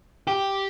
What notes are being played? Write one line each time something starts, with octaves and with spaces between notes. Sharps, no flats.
G4